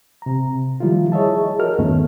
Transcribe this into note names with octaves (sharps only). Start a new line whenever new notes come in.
C3 A#5
D#3 F3 G3 A3 E4 F4
G#4 C#5 D#5 E5 A5
F#4 A#4 F6
E2 G2 D#3 A3 B3 C#4